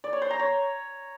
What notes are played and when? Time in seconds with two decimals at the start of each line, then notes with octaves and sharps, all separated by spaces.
0.04 D5
0.13 C#5
0.22 C5
0.31 A#5
0.39 C#5